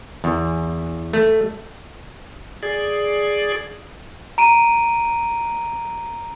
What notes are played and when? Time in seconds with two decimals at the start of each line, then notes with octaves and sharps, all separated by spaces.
0.24 E2
1.13 A3
2.63 G#4 D5
4.38 A#5 D7 D#7